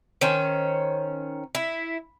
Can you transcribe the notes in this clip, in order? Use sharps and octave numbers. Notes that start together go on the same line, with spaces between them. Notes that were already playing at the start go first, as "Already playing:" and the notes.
D#3 C#4 C5
E4